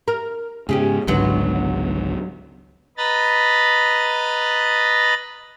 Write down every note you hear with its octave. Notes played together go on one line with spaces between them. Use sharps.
A#4
G#2 C#3 C#4 G4 G#4
G#1 C#2 G#2 D3 F#3 B3
B4 D#5 A#5 B5 A6